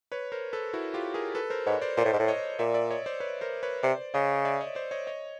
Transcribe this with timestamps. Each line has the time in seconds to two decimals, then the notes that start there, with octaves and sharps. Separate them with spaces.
0.12 B4 C#5
0.32 A#4 C5
0.53 A4 B4
0.73 E4 F#4
0.94 F4 G4
1.14 G#4 A#4
1.35 A4 B4
1.50 A#4 C5
1.66 G#2 B4 C#5
1.81 C5 D5
1.97 A#2 C5 D5
2.05 A2
2.13 G#2
2.19 A2
2.28 C#5 D#5
2.59 A#2 D5 E5
2.74 D5 E5
2.90 C#5 D#5
3.06 C5 D5
3.20 B4 C#5
3.41 A#4 C5
3.63 B4 C#5
3.83 C3 C5 D5
4.14 C#3 C#5 D#5
4.45 D5 E5
4.61 C#5 D#5
4.75 C5 D5
4.91 C#5 D#5
5.07 C#5 D#5